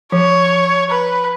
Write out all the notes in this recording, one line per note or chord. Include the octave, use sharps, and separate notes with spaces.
F3 C#5
B4